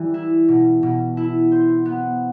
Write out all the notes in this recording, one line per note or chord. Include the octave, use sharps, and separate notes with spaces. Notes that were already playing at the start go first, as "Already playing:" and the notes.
Already playing: E3 G3
E4
B2
B2
E4
C5
B3